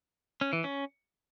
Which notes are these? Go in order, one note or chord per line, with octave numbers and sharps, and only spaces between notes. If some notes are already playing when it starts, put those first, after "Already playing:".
C#4
E3
C#4